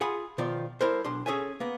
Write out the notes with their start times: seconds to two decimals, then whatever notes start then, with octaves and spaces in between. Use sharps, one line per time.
0.01 F4 G#4 F#5 G#5 B5
0.38 B2 D#3 F3 F4 D5
0.81 G3 E4 A4 A#4 C5
1.05 B1 D4 C6
1.26 C#4 G#4 A4 C#5 E5 G#5
1.60 A#3 B3